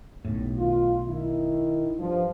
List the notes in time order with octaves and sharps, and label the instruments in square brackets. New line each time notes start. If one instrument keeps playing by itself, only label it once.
[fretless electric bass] B1 A2
[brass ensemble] D#3 F4
D#3 E4
G2 F3